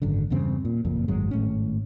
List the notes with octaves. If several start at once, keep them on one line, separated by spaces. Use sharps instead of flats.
G#1 F#2 D3
E2 G2 C#3 C4
A#2
F#1 F2 A#2
G#1 F#2 F#3 G#3
G#1 A2 C#4